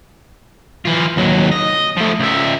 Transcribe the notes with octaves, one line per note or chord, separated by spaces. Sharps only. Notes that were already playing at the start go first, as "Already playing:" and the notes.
E3 F4
D#2 F#3
D#5
F3 A3
C#2 E5